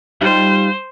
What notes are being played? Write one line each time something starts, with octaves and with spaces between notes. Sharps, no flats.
G3 D#4 F4 C5